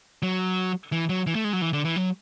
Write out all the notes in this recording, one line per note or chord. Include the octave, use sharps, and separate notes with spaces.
F#3
E3
F#3
E3
A3
G#3
F#3
E3
D3
E3
F#3